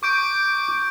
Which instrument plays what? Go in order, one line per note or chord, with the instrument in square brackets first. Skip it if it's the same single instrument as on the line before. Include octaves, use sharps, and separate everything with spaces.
[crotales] C#6 G6 D7 [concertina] D6